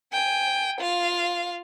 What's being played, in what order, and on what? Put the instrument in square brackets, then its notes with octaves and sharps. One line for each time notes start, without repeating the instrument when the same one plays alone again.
[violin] G5 G#5
F4 F5